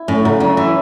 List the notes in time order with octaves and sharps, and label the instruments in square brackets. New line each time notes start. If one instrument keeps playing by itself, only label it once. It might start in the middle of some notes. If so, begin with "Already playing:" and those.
Already playing: [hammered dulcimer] E4
[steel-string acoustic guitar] A2 [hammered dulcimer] C#4
[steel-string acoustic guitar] C#3 [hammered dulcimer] F#3
[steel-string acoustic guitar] D3 [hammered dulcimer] F#3
[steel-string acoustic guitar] E3 [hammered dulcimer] E4